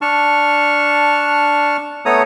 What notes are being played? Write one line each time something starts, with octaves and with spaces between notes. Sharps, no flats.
D4 A5 C#6 F6
A3 B3 A4 C#5 A#5 D#6